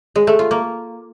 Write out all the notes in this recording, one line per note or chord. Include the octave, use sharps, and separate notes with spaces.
G#3
A3
F4
A#3